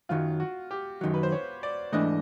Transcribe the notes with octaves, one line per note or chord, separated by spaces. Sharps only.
F#2 D#3 F#3 F4
F#4
G4
F#2 D#3 F#3
B4
C5
C#5
D5
G#2 E3 A3 D4 D#5